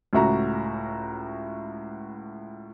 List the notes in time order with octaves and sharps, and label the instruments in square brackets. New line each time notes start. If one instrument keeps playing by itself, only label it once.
[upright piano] C#2 A2 F#4 E5 A#5